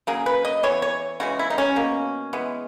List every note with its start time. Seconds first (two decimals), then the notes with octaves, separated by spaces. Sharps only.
0.07 C#3 F#3 A#3 G#4
0.26 B4
0.45 D#5
0.63 E3 B3 C#5
0.82 C#5
1.20 C#3 E3 G#3 F#4
1.39 E4
1.50 D#4
1.58 C#4
1.76 B2 A#3
2.33 E3 G#3 B3